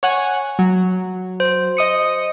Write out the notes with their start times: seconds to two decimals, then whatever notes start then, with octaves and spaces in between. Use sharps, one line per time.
0.03 C#5 F#5 G#5
0.59 F#3
1.40 C5
1.77 D#5 D#6 C#7